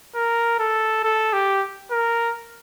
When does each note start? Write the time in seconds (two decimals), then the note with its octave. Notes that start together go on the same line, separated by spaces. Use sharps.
0.15 A#4
0.59 A4
1.04 A4
1.33 G4
1.92 A#4